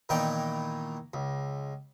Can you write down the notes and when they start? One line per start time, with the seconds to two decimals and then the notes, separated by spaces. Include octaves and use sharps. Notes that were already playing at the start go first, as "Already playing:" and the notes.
0.09 A#2 D#3 E3 B3 D#4 G5
1.14 C#2